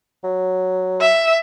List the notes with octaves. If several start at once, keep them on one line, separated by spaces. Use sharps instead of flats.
F#3
E5